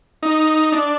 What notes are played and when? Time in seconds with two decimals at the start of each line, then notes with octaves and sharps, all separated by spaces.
0.23 D#4
0.72 D4